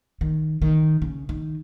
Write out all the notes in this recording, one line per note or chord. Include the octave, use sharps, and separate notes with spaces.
D#3
D#3
C#3
D#3